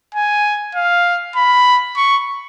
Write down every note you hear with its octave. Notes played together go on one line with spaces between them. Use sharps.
G#5
F5
B5
C#6